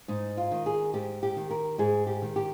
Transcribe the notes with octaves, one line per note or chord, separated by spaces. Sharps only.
G#2 D#4
F4
D#3
G#4
G#2 G4
G4
D#3
A#4
G#2 G#4
G4
D#3
G4